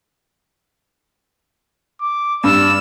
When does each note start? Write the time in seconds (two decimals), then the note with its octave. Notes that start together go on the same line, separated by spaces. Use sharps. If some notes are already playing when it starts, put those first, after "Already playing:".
2.01 D6
2.44 G2 D5 E6